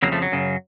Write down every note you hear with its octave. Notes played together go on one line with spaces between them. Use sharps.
F2 C#3 F#3 A#3
F3 A3
F#3
F#2 C#3